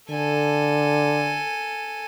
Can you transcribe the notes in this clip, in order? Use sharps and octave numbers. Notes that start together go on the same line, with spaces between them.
D3 A4 G#5